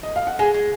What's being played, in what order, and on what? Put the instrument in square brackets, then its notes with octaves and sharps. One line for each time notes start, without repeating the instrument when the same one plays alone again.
[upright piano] D#5
F5
F#5
[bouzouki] G#3 [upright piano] G#5
[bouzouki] G#3